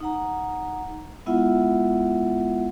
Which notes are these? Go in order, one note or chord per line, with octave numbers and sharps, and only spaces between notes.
D#4 F#5 A#5
G#3 B3 E4 F4 E5 F#5